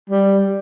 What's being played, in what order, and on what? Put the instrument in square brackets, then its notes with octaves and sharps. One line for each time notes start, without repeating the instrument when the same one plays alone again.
[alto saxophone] G3